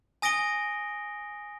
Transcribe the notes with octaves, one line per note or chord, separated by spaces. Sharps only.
G#5 D#6 A#6 D7 G7